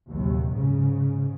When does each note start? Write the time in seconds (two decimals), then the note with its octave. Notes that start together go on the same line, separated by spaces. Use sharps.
0.11 A#1 D#2 C3 F#3
0.51 G#2 C#3